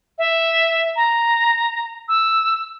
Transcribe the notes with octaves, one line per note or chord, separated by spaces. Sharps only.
E5
A#5
E6